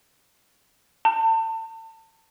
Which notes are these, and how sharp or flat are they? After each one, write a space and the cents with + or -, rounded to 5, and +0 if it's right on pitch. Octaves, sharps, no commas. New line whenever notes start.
A5 +35